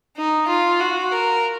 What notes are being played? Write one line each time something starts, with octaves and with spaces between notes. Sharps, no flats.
D#4
F4
F#4
A#4